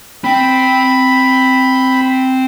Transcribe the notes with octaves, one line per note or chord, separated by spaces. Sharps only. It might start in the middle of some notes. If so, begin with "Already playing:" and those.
C4 G5 B5